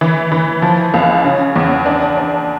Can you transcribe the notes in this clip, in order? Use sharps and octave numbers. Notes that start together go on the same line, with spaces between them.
E3
E3
F3
C#2
C#3
E2
D4
D4